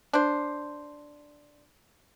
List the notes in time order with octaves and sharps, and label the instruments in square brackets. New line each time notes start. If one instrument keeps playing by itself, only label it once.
[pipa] D4 C5